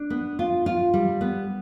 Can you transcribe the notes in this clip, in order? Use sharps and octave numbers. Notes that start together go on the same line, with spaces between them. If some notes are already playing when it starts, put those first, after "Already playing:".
Already playing: D4
B3
F4
F4
G3
B3